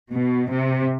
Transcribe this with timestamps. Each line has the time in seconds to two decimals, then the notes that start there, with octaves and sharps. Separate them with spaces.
0.13 B2
0.51 C3